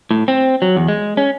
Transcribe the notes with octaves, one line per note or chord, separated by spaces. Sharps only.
A2
C4
F#3
E2
G#3
C#4